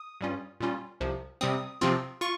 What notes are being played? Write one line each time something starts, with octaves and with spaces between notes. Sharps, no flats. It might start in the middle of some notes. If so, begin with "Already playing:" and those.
Already playing: D#6
G2 G3 C#4 F4
A#2 G3 C#4 F4
C2 C3 F3
C3 G3 C4 D#6
C3 F3 C4 F4
F4 C#6